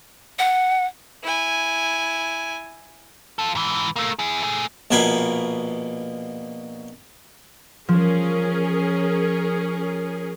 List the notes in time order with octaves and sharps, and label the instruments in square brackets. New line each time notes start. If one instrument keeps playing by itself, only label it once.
[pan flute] F#5
[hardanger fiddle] E4 G#5
[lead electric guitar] F4 A4
G#2 E3
A3 A#3
E4 G#4
A3 G#4
[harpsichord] A#1 B2 A#3 G#5 B5
[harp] F3 [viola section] C#4 G#4 A#4